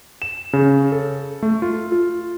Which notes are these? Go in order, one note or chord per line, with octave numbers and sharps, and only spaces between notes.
E7
C#3
A4
A3
F4
F4